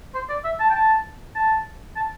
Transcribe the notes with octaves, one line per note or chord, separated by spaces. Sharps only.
C5
D5
E5
A5
G5
A5
A5
A5